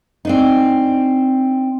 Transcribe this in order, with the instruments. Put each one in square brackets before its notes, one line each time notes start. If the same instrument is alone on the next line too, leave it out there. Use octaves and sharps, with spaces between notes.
[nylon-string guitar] C4 D4 D#4